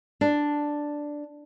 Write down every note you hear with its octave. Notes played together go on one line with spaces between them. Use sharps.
D4